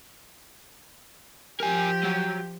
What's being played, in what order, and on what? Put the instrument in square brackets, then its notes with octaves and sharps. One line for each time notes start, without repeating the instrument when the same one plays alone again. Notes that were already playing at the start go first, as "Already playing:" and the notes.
[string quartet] F3 G4 [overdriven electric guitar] A#4 G#5 [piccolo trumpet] G5
[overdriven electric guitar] F#3